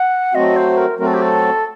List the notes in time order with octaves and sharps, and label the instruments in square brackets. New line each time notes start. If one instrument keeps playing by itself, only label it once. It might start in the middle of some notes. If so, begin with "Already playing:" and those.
Already playing: [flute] F#5
[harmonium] F#3 A3 C4 F#4 [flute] D#5
[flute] C5
A#4
[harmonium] F#3 A3 C4 F#4 [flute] A#4
[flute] A4
G4
A4